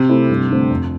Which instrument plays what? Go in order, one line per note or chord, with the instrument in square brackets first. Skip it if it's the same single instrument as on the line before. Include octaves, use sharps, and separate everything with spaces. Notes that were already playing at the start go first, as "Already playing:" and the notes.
Already playing: [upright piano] C3
[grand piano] A3 C4 E4 A4
G2
D3 A3 C4
F2